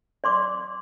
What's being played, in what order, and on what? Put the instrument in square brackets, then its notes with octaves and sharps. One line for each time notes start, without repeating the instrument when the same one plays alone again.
[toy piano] D5 C6 D6